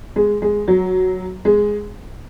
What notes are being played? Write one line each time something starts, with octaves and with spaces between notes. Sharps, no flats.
G#3
G#3
F#3
G#3